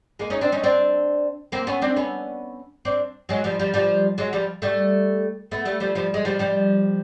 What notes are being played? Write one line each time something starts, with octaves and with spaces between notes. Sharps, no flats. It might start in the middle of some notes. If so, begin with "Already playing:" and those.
G#3 A#3
C#4 D#4
C4 D4
C#4 D#4
C4 D4
A#3 C4
B3 C#4
C4 D4
B3 C#4
C4 D4
F#3 G#3
F3 G3
F3 G3
F3 G3
F#3 G#3
F3 G3
G3 A3
A3 B3
G3 A3
F3 G3
F3 G3
G#3
F3 G3
F3 G3